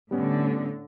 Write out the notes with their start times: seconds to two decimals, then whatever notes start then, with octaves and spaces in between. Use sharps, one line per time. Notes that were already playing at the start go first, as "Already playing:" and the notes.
0.11 A2 D3 G3 B3 C#4